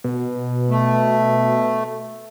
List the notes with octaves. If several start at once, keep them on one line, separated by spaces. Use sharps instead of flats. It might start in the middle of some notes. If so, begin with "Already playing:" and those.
B2
A3